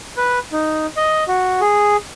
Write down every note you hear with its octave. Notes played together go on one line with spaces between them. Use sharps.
B4
D#4
D#5
F#4
G#4